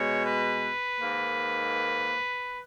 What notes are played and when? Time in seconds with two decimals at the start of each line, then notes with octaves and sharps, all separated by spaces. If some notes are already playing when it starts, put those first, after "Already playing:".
Already playing: B2 G#3 C#5
0.25 B4
0.99 G#2 D#3 A#3